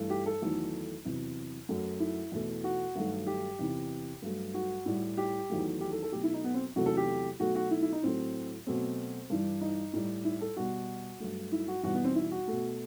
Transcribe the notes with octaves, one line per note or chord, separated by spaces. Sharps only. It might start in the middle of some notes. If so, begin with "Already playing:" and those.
Already playing: G2 E3 A3
G4
A4
E2 D#3 F#3 A3
E2 C3 F#3
F#2 F#3 A3
E4
E2 B2 A3
F#4
G2 D#3 F#3 A3
G4
E2 C3 E3
G2 F#3 A3
F#4
A2 G3
G4
E2 D#3 F#3 A3
G4
A4
A4
B2 F#3 A3 G4
E4
D#4
B3
C4
E2 C3 F#3 A3 F#4
A4
G4
B2 F#3 A3 F#4
F#4
E4
E4
D#4
A2 F#3 A3 C4
B2 F#3 A3 C4
G2 E3 G3
D#4
A2 G3
E4
A4
B2 G3 F#4
G2 F#3 A3
E4
F#4
E2 B2 G3 F#4
B3
C4
E4
F#4
B2 A3